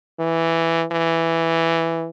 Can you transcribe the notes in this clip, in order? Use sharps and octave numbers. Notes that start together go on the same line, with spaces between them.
E3
E3